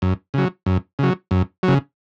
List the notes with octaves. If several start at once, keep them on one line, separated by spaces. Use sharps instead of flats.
F#2
C#3 F#3
F#2
C#3 F#3
F#2
F#3
C#3